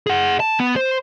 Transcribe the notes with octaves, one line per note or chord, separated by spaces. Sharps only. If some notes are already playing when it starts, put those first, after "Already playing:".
G#4 F#5
A5
B3
C5